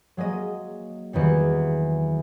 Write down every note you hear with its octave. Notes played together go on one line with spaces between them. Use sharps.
F#3 G#3 A#3 D#5
E2 D#3 F#3 G3